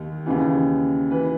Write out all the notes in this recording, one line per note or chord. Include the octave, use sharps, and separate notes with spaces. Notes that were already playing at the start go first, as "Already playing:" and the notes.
Already playing: D#2 D#3
D#2 C#3 E3
E3 B4